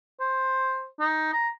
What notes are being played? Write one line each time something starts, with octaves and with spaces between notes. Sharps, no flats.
C5
D#4
A#5